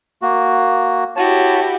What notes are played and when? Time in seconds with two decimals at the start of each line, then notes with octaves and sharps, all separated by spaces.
0.22 A#3 F#4
1.16 E4 F#4 G4 C#5 A5